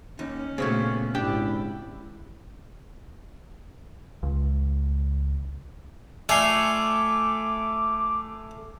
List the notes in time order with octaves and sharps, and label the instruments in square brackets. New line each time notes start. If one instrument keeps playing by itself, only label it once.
[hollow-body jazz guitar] D#2 D#4 [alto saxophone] C#4
[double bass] A#2 [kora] C#3 F#4 C#5 [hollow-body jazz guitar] A3 B3 C4
[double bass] G#1 E4 [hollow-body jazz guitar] D4 [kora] G4
[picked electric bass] C#2
[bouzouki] A3 [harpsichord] F4 G#5 C6 [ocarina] D6